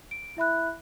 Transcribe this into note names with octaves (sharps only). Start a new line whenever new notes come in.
D7
E4 E5 B5 F#6